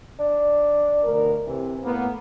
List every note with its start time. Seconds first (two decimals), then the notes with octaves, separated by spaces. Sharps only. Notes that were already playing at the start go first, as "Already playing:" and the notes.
0.20 D4
1.04 D2 B2 A#4
1.45 C3 E3
1.84 A2 A#3 B3